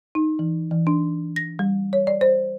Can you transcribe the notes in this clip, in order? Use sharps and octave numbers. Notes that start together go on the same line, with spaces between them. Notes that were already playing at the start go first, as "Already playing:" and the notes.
D#4
E3
E3
D4
A#6
G3
C#5
D5
C5